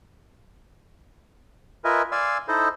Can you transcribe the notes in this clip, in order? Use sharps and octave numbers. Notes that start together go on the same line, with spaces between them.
F4 A#4 B4 D#5 E5 G#5
D5 F5 G#5 C6 E6
D#4 E4 A4 C5 D#5